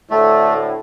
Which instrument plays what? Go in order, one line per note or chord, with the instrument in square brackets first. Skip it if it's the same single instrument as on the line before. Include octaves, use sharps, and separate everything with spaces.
[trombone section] D2 A2 D3 [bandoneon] A3